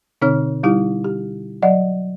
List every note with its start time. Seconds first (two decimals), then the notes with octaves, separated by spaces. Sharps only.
0.21 B2 D3 C4 D#4 C#5 F6
0.63 G3 D#4 E4 G4
1.05 G4
1.62 F#3 D5 D#5 F#5